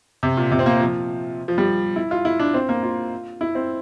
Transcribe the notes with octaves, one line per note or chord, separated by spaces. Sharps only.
C3
A#2
C3
C4
A#3
F3
F3
G3
E4
F4
E4
D4
C4
A#3
F4
E4
C4